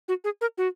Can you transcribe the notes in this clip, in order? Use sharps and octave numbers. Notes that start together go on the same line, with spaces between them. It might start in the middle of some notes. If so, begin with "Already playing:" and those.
F#4
G#4
A#4
F#4